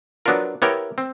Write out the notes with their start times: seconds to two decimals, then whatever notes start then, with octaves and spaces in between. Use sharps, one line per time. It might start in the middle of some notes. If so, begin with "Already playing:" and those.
0.26 F#3 B3 D4 F4 A#4
0.62 B3 E4 G4 A#4 C#5
0.98 C4